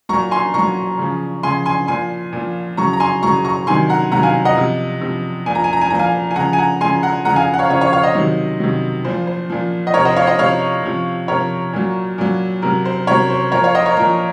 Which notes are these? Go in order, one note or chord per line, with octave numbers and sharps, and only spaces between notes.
A#2 F#3 A#5 C#6
G#5 C6
A#2 F#3 A#5 C#6
C#3 F3
C#3 F3 G#5 C6
G#5 C6
A#2 F3 G#5 C6
A#2 F3
C#3 F#3 A#5 C#6
A#5
G#5 C6
C#3 F#3 A#5 C#6
A#5 C#6
C3 D#3 F#3 G#5 C6
F#5 A#5
C3 D#3 F#3 F#5 A#5
F5 G#5
D#5 F#5
C3 F3
C3 F3
A#2 F3 G#5
A#5
G#5
A#5
G#5
A#2 F3 A#5
F5 G#5
G#5
C#3 F3 F#5 A#5
G#5
F#5 A#5
C#3 F3 G#5 C6
F#5 A#5
C#3 F3 F#5 A#5
F5 G#5
F#5
C#5 F5
C#3 F3 C#5 F5
C#5 F5
C#5 F5
C5 D#5
C3 D#3 F#3
C3 D#3 F#3
A#2 F3 C5
C5
A#2 F3
D#5
C3 F3 A#4 C#5
C5 D#5
C#5 F5
C5 D#5
C3 F3 C#5 F5
C3 F3
C3 F3 A#4 C#5
A#2 F#3
A#2 F#3
C3 F#3 A#4
C5
C3 F#3 A#4 C#5
C5
A#2 F3 A#4 C#5
C#5 F5
C5 D#5
A#4 C#5
A#2 F3 A#4